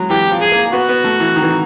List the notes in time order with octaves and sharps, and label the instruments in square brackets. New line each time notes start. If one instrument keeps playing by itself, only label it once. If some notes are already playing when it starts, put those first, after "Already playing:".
Already playing: [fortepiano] F#3 G#3
[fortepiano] E3 [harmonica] G4
[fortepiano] F3
[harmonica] G#4
[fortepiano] A#3
[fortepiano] B3 [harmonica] F#4
[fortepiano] B3
A3
E3
D#3
E3
D#3